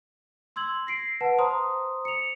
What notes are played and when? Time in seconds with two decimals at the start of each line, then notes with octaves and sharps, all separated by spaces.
0.56 C6 E6 G#6 F#7
0.87 A#6 C7 D7
1.21 B4 F#5 A5
1.38 C5 A#5 C6 D#6
2.05 C#7 F7